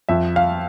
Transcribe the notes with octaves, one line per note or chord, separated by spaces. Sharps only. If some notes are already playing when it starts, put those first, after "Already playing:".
F2 E5
F5